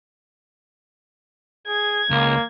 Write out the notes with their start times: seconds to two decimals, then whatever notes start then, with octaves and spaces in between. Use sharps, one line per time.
1.68 G#4 G#6
2.11 C#2 A#3